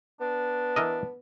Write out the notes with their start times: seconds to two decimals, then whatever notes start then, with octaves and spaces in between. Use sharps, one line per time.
0.20 B3 D4
0.76 E3 A#4 D#5